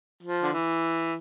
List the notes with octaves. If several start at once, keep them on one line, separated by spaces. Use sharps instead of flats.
F3
D3
E3